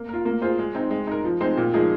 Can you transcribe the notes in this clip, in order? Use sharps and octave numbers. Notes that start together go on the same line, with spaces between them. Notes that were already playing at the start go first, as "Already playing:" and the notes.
Already playing: A#3
F4 A#4
A#3
F4 G#4 C5
G#3
C4 D#4
G#3
D#4 A#4
F3
G#3 C4 D#4 C5
A#2
F3 G#3 D#4 G#4